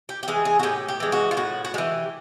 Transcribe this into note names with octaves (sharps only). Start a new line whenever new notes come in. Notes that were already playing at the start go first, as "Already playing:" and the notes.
G4
G4
E3 G#3 G#4
G#4
F#4
A2 G4
G4
E3 G#3
F#4
F4
A2 F#4
F#4
E3 G#3 G4